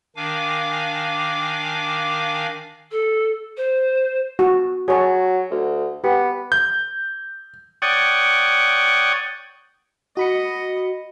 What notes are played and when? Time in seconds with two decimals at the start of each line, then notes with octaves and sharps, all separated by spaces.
0.16 D#3 D4 F5 G#5 D6
2.91 A4
3.57 C5
4.39 F#4
4.88 F#3 G#4 C#5 A5
5.51 D2
6.04 B3 G4
6.52 G6
7.82 C#5 D5 F#5 G5 C#6 D#6
10.17 F#4 D#5 B5 C#7